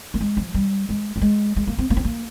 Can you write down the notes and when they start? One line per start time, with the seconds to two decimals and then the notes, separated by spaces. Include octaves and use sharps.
0.14 A#3
0.21 G#3
0.37 F3
0.54 G3
0.89 G#3
1.16 G3
1.22 G#3
1.56 G#3
1.67 A#3
1.79 C4
1.90 A#3
1.97 C4
2.04 A#3